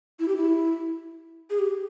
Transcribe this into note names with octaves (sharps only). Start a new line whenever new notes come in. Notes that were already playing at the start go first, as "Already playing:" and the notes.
E4
G4
E4
G#4
G4